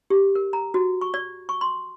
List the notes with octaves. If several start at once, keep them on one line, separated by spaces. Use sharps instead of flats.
G4
A#4
A#5
F#4
C#6
D5
C#6
C6